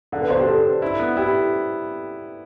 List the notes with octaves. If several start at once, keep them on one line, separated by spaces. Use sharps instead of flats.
D3 F#5
B4
D4 C5
G4
D4 A4
D4
E4
B3
E4 G4